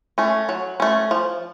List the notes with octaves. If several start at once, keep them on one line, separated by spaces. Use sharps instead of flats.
A3 C#4
F#3
A3 C#4
F3